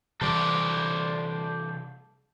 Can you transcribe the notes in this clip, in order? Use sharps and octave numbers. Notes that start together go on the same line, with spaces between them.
C3 E3 G3 A4 C5 D5